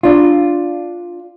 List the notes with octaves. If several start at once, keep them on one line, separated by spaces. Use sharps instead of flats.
D4 F4